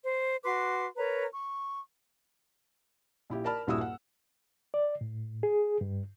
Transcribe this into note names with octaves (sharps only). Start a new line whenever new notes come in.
C5
F#4 B4 C6 D6
A#4 B4 C#5 A#5
C#6
A#1 E4 G4
A#4 D5 A5 B5 F6
D#1 G2 E4 F#4 D#6 E6
F#5
D5
A2
G#4
G2